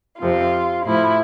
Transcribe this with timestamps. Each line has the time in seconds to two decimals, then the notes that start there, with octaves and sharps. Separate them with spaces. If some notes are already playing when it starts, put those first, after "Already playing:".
0.20 F2 C3 F3 F4
0.85 A2 F3 E4